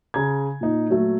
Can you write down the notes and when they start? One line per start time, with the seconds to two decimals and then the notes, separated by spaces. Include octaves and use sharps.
0.14 C#3 A#5 G#6
0.61 A#2 D#4
0.89 A#2 F#3 A3